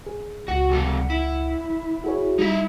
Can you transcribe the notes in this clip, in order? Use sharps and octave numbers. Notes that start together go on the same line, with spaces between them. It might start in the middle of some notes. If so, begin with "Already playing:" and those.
G#4
C#2 F#4 F#5 C#7
C3 G3 A4
E4
F#4 G#4 C#5
G3 D#4 E4 E5